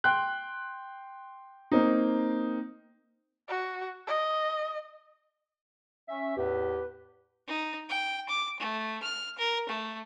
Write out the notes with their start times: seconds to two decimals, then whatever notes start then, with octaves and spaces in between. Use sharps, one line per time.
0.04 G5 C6 F#6
1.71 A#3 C4 D#4
3.48 F#4
4.07 D#5
6.08 C#4 E5
6.37 E2 A2 G4 B4
7.48 D#4
7.89 G5
8.29 D6
8.60 A3
9.02 F6
9.38 A#4
9.69 A3